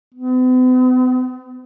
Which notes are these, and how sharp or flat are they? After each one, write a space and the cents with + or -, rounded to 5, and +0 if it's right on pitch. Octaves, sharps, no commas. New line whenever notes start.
B3 +45